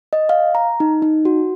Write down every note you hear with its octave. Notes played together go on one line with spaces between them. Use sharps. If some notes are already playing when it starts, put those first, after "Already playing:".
D#5
F5
A#5
D#4
D#4
F#4